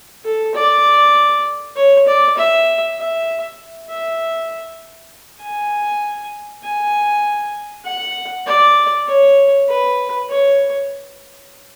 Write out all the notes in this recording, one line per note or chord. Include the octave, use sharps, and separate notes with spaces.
A4
D5
C#5
D5
E5
E5
E5
G#5
G#5
F#5
D5
C#5
B4
C#5